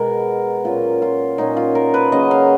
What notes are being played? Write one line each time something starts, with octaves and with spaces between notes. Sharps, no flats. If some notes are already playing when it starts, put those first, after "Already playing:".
Already playing: B2 G#3 B3 A#4
A#2 F#3 A#3 C#4 F4
F4
A#2 F#3 A#3 C#4 D#4
F4
A#4
B4
C#3 F#3 A#3 D#5
F5